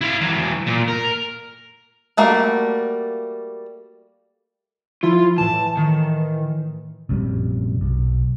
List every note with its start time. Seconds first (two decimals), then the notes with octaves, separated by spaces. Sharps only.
0.01 E4 F5
0.21 E3 F#3
0.67 A#2
0.88 A#4
2.17 G3 A3 A#3 F#4
5.03 F3 E4 F4
5.38 A2 E3 A5
5.77 D#3
7.09 A#1 F#2 C3 G3
7.81 B1